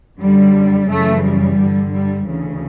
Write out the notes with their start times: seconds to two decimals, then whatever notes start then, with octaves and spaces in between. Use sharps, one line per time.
0.19 F#2 D3 G3
0.88 F#2 C#3 E3 A3
1.23 G3
1.57 G2 D3
1.93 G3
2.26 D2 C#3 E3